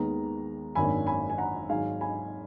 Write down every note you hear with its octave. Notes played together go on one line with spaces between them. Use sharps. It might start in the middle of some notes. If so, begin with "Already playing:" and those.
Already playing: D#2 D#3 G#3 B3 A#5
G#1 F#2 D#3 A#3 D4 G#5 B5
G#5 B5
G#5
F#5 A#5
G#2 D#3 F#3 F5 G#5
G#5 B5